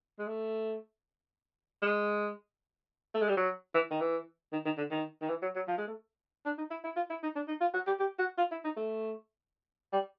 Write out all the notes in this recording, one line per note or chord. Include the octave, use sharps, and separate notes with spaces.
G#3
A3
G#3
A3
G#3
G3
F#3
E3
D#3
E3
D#3
D#3
D3
D#3
D#3
E3
F#3
F#3
F3
G#3
A3
D4
D#4
E4
E4
F4
E4
D#4
D4
D#4
F4
F#4
G4
G4
F#4
F4
E4
D#4
A3
G3